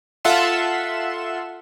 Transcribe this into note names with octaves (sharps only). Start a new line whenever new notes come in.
F4 A4 E5 F#5 C6 E7